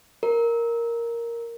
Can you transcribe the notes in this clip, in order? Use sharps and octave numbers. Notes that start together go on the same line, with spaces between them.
A#4